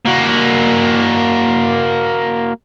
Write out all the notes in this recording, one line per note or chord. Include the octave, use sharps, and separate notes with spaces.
A#3 F#4